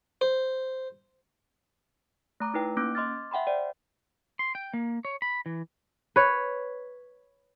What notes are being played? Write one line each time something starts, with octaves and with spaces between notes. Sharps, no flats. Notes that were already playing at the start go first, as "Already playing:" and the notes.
C5
A3 A#5 D6
D#4 E4 B4 G5
A#3 C#4 D6 F#6 D7
D#5 C6 D6 F6 A6
E5 F#5 G5 B5 C6
C5 D5 G5
C6
G5
A#3
C#5
B5
E3
B4 C#5